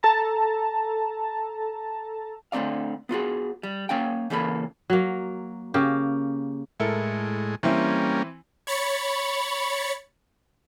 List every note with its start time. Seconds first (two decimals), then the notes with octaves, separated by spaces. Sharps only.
0.03 A4 A5 A#5
2.52 D3 A3 C4 D5 F5
3.09 B3 F4 F#4 G#4
3.63 G3
3.89 A#3 C#4 F5 G5
4.30 C#3 E3 A#3 A4 B5
4.90 F#3 A#3
5.74 C#3 A#3 G4
6.80 A2 G#3 E4 A4 A#4
7.63 E3 G3 A#3 C4 C#4 E4
8.67 C#5 B5 A6 C#7